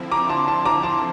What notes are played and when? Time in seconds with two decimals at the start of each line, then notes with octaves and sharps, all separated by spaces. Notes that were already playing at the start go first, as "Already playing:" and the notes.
Already playing: D3 F3 C4 E4
0.12 A#5 D6
0.29 A5 C6
0.48 A5 C6
0.65 A#5 D6
0.83 A5 C6